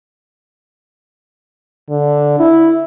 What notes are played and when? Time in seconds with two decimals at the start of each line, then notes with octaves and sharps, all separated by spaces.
1.90 D3
2.40 E4